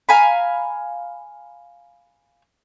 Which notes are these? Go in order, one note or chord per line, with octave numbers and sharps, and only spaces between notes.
F5 G#5 A#5 B5